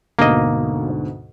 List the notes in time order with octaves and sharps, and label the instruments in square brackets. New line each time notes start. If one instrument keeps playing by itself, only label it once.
[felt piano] D2 G#2 B2 [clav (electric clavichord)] A#3 D#5